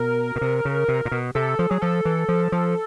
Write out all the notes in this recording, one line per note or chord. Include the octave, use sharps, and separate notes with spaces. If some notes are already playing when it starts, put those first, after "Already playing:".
Already playing: B2 A#4
B2
C3
C#3
C3
A#2
B2
C3 A4
F3
F#3 G#4
F3 A4
E3
F3
F3